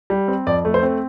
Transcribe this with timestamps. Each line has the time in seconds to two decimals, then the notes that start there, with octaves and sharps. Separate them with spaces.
0.10 G3
0.28 C4
0.47 F2 D5
0.65 A3
0.74 C5
0.83 C4